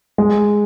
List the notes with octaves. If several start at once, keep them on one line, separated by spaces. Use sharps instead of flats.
G#3